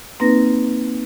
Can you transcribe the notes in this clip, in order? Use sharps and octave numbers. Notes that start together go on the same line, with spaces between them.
A#3 C4 D#4 B4 A#6